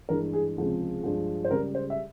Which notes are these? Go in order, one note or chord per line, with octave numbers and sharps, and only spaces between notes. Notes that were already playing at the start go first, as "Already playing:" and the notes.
G2 E3 G#3 A#4
G#4
C#2 C3 F3 G#3
G2 F3 G#3
C5
C#2 C#3 G3 A#4
C5
E5